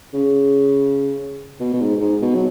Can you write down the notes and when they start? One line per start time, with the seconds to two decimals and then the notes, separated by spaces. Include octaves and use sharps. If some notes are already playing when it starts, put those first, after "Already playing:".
0.14 C#3
1.60 B2
1.73 B2
1.81 G#2
2.01 G#2
2.22 B2
2.35 F#3